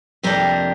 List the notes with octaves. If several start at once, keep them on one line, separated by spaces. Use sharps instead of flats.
F2 C3 F3 A#3 D4 G4 A#4